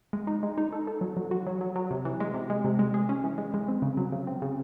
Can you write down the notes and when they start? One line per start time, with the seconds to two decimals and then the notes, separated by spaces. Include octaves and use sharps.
0.13 G#3
0.27 D#4
0.43 G#3
0.58 D#4
0.72 A4
0.87 A4
1.01 F#3
1.17 F#3
1.31 F#4
1.47 F#3
1.61 F#3
1.76 F#3
1.91 C3
2.05 E3
2.20 G#3
2.34 C3
2.50 G#3
2.65 C3
2.79 G#3
2.94 G#4
3.09 C#4
3.24 E3
3.38 G#3
3.54 G#3
3.68 C4
3.82 C#3
3.97 F#3
4.12 C#3
4.27 C4
4.42 C#3